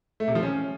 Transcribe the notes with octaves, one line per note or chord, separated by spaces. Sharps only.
A3
C3
F3
C#4